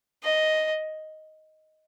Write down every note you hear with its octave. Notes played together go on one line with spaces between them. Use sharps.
D#5